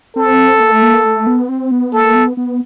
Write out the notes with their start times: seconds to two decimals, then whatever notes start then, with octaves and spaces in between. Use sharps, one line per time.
0.16 C4 A4
0.60 A#3
0.72 A3
0.82 A#3
1.05 A3
1.27 B3
1.49 C4
1.71 B3
1.93 A#3 A4
2.15 B3
2.37 B3